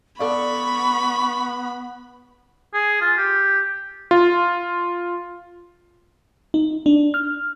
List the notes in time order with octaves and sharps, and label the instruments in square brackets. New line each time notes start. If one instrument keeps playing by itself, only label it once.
[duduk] B3 [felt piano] A4 D5 F5 [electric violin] B5 [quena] C#6
[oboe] G#4
F4
G4
[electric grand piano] F4
[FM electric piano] D#4
D4
F6